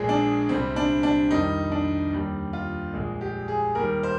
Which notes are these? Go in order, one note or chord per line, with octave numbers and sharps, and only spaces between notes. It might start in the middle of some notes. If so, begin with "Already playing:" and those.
Already playing: A#1 A#2 F3 G#3 G#4
D4
C2 C3 G3 C4
D4
D4
F2 D#3 G3 D#4
D4
D#2 D#3 G3
F4
A#1 A#2 G#3
G4
G#4
D#2 D#3 G3 A#4
C5